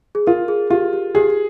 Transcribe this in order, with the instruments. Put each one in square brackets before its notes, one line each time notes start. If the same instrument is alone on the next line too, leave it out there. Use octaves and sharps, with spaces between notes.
[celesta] G#4
[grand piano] F4 [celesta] A#4
[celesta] G#4
[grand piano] F4 [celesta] G4
[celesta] G4
[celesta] G4 [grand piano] G#4